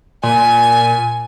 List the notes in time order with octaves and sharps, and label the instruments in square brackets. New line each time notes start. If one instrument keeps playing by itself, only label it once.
[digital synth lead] A#2 [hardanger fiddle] G#5